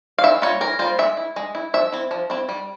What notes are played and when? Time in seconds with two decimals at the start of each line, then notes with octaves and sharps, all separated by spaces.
0.18 F5
0.23 E3 E5
0.42 G3 A#3 F4 C#5
0.61 E3 A#4
0.79 G3 A#3 F4 C5
0.99 G#3 E5
1.17 E4
1.36 G#3
1.55 E4
1.74 F3 E5
1.92 C4 E4
2.11 F3
2.30 C4 E4
2.49 G3